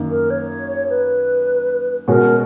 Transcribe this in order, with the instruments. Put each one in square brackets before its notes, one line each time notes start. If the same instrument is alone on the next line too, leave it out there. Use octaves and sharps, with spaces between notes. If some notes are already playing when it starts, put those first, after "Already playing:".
Already playing: [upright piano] F#2 D#3 A#3
[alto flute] A#4
C#5
B4
[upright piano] B2 G#3 C#4 F#4 [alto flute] A#4